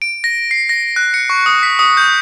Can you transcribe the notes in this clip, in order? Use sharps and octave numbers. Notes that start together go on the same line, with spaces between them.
D7
A#6
C7
A#6
F#6
C#7
C#6
D#6
B6
D#6
G6